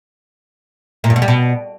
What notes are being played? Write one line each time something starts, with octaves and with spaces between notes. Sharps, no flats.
A#2
G2
B2
G3
B2